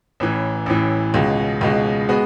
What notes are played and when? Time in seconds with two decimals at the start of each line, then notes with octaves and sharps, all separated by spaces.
0.20 A1 A2 E3
0.66 A1 A2 E3
1.14 C#2 B2 G#3
1.61 C#2 B2 G#3
2.09 G#3 B3 F#4